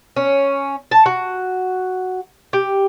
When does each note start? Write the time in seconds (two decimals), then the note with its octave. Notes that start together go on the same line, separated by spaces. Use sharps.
0.16 C#4
0.91 A5
1.06 F#4
2.53 G4